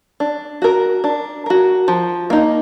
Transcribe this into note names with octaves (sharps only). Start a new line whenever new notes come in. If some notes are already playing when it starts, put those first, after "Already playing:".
D4
F#4 A#4
D4
F#4 A#4
F3
A#3 D#4